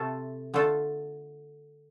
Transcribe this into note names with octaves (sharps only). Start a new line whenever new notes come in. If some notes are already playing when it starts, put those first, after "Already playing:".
Already playing: C3 A3 F4 A4
D3 A3 F4 A4